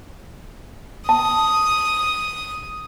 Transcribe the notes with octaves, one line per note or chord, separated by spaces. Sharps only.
A5 D#6